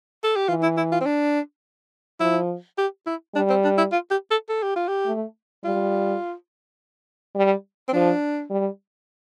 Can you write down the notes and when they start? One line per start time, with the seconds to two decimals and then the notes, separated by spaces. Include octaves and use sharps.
0.24 A4
0.36 G4
0.48 E3 F4
0.63 E4
0.77 E4
0.92 F4
1.01 C4
1.06 D4
2.20 F3 E4
2.78 G4
3.07 E4
3.35 G3 D4
3.50 C4
3.64 D4
3.78 E4
3.92 F4
4.11 G4
4.31 A4
4.49 A4
4.63 G4
4.76 F4
4.88 G4
5.06 A3
5.64 G3 F4
7.35 G3
7.89 C4
7.93 F3 D4
8.50 G3